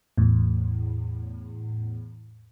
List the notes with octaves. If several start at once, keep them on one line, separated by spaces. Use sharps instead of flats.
E2 A2